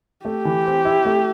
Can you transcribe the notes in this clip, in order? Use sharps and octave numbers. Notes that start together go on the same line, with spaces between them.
A3 G4
E3
C4
E4
A3